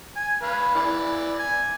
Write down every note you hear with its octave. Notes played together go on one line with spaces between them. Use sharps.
G#5
B4 F5
E3 D5
G#5